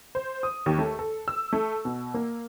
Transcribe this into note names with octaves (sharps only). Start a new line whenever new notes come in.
C5
D#6
D#2
A3
A4
E6
A3
B2
A#3